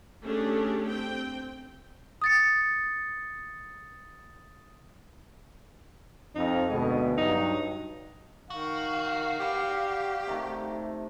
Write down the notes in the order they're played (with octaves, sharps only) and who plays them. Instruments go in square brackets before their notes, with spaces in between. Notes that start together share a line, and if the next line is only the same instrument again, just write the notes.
[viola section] A3 C#4 D4 G4 G#4
C4 G5
[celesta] D#6 A6 C#7
[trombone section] F2 [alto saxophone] D#4
[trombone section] D2 B2 [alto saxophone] G#3
[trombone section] G2 F#3 [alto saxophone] D#4
[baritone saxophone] D#3 [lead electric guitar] F#4 [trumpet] F5
[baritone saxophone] G4 [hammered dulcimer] B4 D5
[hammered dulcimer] C3 D#3 A3